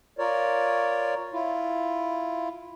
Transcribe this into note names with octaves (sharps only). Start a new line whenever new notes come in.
F4 A#4 C#5 D5
E4 F4